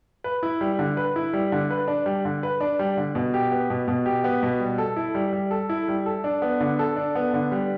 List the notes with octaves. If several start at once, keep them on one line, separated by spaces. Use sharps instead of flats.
B4
E4
G3
D3
B4
E4
G3
D3
B4
D4
G3
D3
B4
D4
G3
D3
B2
G4
B3
B2
B2
G4
B3
B2
G3
A4
E4
G3
G3
A4
E4
G3
A4
D4
B3
D3
A4
D4
B3
D3
G3